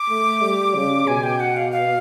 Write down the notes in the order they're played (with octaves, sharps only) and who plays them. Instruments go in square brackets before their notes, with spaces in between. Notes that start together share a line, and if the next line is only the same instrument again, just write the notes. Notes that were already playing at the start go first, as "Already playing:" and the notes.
Already playing: [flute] D6
[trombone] A3
G3
C#3
[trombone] B2 [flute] G#5
[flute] G5
F#5
F5
F5